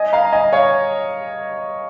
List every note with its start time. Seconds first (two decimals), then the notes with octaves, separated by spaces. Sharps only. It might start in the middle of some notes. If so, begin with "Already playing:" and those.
Already playing: D#5 G#5
0.13 F5 A#5
0.33 D#5 G#5
0.53 C#5 F5